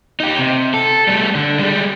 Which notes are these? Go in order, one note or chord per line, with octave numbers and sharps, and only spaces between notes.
D#4 G4
C3
A4
G3 A3
D3
G3 G#3